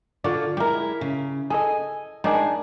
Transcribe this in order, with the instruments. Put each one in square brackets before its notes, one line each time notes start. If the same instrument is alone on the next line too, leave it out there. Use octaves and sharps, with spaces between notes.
[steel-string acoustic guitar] D3 F4 [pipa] F#4 D5
[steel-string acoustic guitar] G#3 E4 [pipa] G4 A#4
[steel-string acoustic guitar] C#3
[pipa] G#4 A4 D#5 [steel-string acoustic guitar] G#5
[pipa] D#3 D4 G#4 [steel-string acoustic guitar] G#3